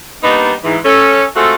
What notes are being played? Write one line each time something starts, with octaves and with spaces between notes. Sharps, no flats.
G3 A#3 B3 D4 D#4
G#2 E3
C#4 A4
G#3 A3 C4 F4 F#4 A4